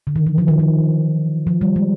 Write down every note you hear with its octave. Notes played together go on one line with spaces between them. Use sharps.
D3
D#3
E3
F3
D#3
F3
F3
G3
G#3